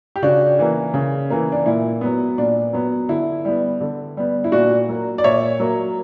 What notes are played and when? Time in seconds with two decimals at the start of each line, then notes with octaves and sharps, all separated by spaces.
0.16 G4
0.22 C#3 D4 F#4
0.59 E3 A#3
0.94 C#3
1.30 E3 A#3
1.52 D4
1.66 A#2 E4
2.01 F#3 B3
2.38 A#2 D4
2.73 F#3 B3
3.09 D3 E4
3.45 G3 B3
3.81 D3
4.17 G3 B3
4.44 E4
4.52 A#2 D4 F#4
4.89 F#3 A#3
5.18 D5
5.24 A#2 C#5 E5
5.60 F#3 A#3